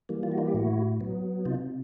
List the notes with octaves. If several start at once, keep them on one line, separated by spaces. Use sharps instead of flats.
E3 G3 A#3
F4
F#4
D#4 F4
G4
A2 E4 F#4
F#3 B3
C3 D#4 F4